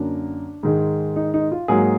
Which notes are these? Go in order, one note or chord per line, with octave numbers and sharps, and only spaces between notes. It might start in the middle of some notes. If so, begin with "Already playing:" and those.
Already playing: F#2 D3 F#3 A#3 D4
G#2 D#3 G#3
D#4
D#4
F4
G#2 F#3 A#3 G#4